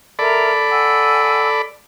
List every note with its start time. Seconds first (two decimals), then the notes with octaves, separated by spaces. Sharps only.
0.19 A4 A#4 D5 E5 B5
0.69 F#5 G#5 E6